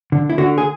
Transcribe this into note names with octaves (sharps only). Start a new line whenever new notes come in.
D3
E4
D3 F#4
G#4